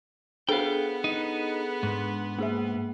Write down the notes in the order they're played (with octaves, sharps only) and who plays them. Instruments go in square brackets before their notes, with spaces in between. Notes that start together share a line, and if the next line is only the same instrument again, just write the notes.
[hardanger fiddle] B3 [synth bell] D4 G#4 A4 [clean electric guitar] F5 G5
[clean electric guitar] D#4
G#2
[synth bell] A#3 G#4 E5